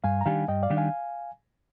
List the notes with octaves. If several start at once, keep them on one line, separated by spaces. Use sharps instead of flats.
G2 F5 G#5
A#5
D#3 G3 D4 G4 F5 G#5
G2 D#5 G5
D5 F5
D#3 G3 D4 G4
F5 G#5